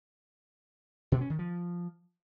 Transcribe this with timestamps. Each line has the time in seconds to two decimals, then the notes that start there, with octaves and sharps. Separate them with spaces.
1.12 B2
1.21 C#4
1.30 D#3
1.39 F3